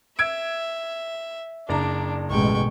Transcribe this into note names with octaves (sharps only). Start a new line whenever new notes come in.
E5 E6 G#6 D7
F#1 D4 D5 A#5
A1 B2 G#3 G5 C#6